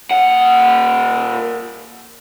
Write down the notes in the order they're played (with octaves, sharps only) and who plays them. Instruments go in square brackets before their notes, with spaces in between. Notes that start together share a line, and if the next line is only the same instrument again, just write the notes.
[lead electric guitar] A#2 F#5